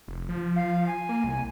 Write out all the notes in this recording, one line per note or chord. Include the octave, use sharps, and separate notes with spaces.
F1
F3
F5
G#5
A#3
C2